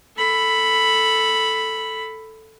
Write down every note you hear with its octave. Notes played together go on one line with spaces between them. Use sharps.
A4 B5